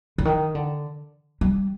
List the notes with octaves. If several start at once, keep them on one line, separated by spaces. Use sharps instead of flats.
D3
D#3
D3
G3